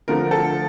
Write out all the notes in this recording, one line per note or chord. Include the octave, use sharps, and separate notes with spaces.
D3 F3 A3 A#4
A4